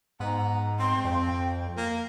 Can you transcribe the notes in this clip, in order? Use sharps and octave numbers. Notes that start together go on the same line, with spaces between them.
G#2 B3 A#5
C4 C6
F2 G5
A#3